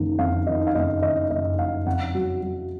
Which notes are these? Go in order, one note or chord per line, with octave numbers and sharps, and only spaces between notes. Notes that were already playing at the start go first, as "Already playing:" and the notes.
Already playing: F#1 D#3
F2 F5
D#3 D#5
F5
F#1 D#5
D#3 D#5
F#1 D#5
F#1 F5
F2 F#5
F#3
F#3